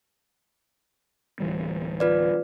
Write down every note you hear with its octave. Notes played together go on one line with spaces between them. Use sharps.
D1 E3 G3
F4 B4 D5